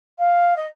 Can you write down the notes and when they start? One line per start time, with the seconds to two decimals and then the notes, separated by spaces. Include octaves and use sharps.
0.18 F5
0.56 D#5